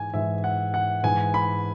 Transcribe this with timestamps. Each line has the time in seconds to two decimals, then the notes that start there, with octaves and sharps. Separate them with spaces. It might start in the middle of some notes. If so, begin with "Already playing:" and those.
Already playing: G#2 E3 G#5
0.14 G#2 E3 E5
0.44 F#5
0.74 F#5
1.03 G#2 E3 G#5
1.34 B5